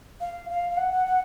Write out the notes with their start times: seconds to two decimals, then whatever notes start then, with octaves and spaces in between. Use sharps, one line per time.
0.21 F5
0.50 F5
0.70 F5
0.77 F#5
0.91 F#5
1.06 F#5